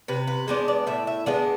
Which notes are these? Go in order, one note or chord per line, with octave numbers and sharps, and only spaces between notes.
C3 B4
B4
G#3 B3 D4 C5
D5
A2 E5
E5
G#3 B3 D4 D5